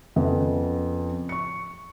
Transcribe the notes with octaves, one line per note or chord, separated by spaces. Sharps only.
F2 C#3 B3
C#6 C#7